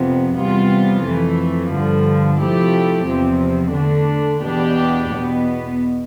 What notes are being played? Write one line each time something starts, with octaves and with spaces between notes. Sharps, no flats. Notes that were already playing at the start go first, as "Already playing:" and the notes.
Already playing: F2 C3 F3 B3
E2 C3 G3 B3 F4
F2 E3 A3
G2 D3 F3
C3 F3 A3 E4 G4
E2 C3 F3 C4
D3 A3 D4
E2 B2 B3 D4 G4
E2 B2 B3